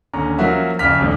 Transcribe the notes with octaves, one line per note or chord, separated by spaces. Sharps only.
D#2 D3 C#4 A#5
F3 F#3 A#3 C#4 F#4 E5
F#1 F2 C#3 F6 B6
D#1 D2 D3